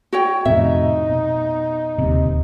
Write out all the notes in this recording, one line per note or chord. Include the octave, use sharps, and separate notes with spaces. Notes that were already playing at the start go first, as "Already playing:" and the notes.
F#4 C#5 G5
F2 A2 C3 C4 D#4 E5
B2
D1 D#2 C3